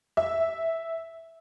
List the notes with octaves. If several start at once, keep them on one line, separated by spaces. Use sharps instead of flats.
E5